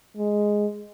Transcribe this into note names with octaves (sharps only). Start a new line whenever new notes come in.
G#3